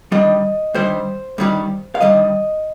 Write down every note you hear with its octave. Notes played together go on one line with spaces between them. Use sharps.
G2 D#3 G3 D#5
G2 D#3 G3 C5
G2 D#3 G3
F5
G2 D#3 G3 D#5